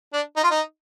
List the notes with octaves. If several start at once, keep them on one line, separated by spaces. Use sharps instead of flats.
D4
D#4
F4
D#4